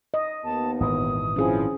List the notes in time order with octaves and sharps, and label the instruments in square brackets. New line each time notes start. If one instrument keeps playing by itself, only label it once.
[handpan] D#5
[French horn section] D#2 B3 [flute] A5
[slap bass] G#1 A#2 E3 [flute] D#6
[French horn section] F3 C4 E4 [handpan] C#4 G#4